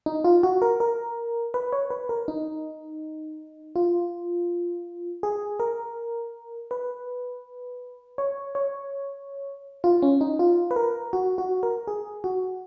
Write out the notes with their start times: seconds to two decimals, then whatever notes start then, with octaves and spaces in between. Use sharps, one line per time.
0.06 D#4
0.24 F4
0.43 F#4
0.62 A#4
0.80 A#4
1.54 B4
1.73 C#5
1.90 B4
2.09 A#4
2.28 D#4
3.76 F4
5.23 G#4
5.60 A#4
6.71 B4
8.18 C#5
8.55 C#5
9.84 F4
10.02 C#4
10.21 D#4
10.39 F4
10.71 B4
10.76 A#4
11.13 F#4
11.38 F#4
11.63 A#4
11.87 G#4
12.24 F#4